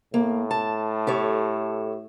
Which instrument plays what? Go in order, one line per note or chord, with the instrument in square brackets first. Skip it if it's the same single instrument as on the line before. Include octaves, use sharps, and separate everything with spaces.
[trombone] A2 [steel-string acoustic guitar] A#3
[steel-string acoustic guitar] A5
G4 A4 C#5